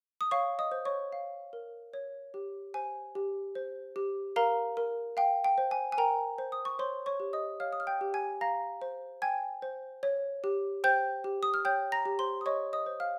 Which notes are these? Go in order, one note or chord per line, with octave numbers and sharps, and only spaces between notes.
D#6
C#5 F5 C#6
D#5 D#6
C5
C#5 C#6
F5
A#4
C#5
G4
C5 G#5
G4
C5
G4
A#4 F5 A#5
A#4
F5 G5
G5
C5
G#5
G#5
A#4 G5 A#5
C5
D#6
C#6
C5 C#5 C6
C#5 C#6
G4
D#5 D#6
C#5 F5 F6
D#6
F6
G5 G6
G4
G#5 G#6
F5 A#5 A#6
C5
G5 G#5 G#6
C5
C#5
G4
C5 G5 G6
G4
D#6
F6
C#5 G5 G6
A#5 A#6
G4
C5 C6
D#6
C#5 D#5 C#6
D#5 D#6
C5
F5 F6